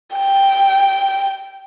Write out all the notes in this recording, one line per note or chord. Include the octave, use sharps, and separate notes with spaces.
G5